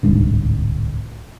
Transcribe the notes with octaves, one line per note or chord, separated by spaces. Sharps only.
D1 C2 G#2 D3